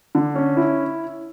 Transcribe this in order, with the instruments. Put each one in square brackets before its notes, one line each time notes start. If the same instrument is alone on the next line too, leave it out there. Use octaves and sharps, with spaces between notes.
[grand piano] D3
C#4
E4